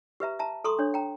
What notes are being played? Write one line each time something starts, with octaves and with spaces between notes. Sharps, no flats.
G4 B4 E5 A#5
E5 A5 A#5
A4 A#5 C6 C#6 D#6
D4 C#5
G5 A#5